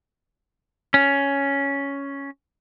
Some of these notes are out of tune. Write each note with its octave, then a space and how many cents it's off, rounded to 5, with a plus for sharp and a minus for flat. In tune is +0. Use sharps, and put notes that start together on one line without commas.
C#4 +5